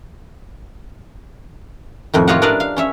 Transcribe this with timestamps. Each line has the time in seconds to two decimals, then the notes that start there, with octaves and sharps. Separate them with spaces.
2.14 F2 A2 D#3
2.28 F4 G4 C#5 D#5 F5 F#5
2.42 D4 A#4 B4 D5 D#5 F5
2.60 F5
2.77 C#4 C#5 E5